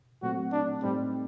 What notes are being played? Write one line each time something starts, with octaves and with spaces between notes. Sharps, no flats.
A#2 F#3 A3 C4 F#4
D4
A2 G3 A3 C4 D#4